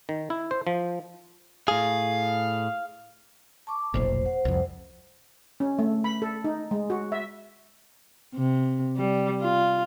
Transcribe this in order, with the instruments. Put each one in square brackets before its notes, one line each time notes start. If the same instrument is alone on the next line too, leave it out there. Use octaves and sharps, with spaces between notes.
[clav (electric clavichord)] D#3
E4
C5
F3
[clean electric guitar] A2 G#4 [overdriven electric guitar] F5
[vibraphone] A5 C#6 D6
[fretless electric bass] F1 B1 A#2 [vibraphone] C5
[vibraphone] C5 F#5
[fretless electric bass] C2 F2
[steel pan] C#4
A3
B5
A4
D#4
G#3
F#4
E5
[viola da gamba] C3
G3
F4